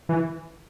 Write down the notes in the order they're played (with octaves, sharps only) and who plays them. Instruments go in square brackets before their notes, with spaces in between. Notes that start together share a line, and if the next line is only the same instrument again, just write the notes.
[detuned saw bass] E3